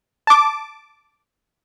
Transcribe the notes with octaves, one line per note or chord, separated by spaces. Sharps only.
A5 D6